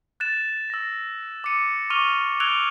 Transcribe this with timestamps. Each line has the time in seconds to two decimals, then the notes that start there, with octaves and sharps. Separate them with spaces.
0.20 F#6 A6 E7
0.70 E6 A#6
1.44 D6 E6 C#7 D#7
1.90 C#6 D6 F6 D#7 F7 G7
2.40 E6 F#6 G#6 D7 F7 G7